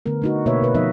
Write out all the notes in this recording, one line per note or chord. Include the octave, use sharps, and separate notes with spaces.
D3 A3 B3 A#4
A3 D#4 F#4
B2 A#3 F#4 B4 C#5 E5
B2 B4
F3 B3 D#4 D#5 E5